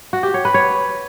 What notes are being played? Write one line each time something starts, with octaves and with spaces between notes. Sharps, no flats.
F#4
G4
C#5
B4
C#5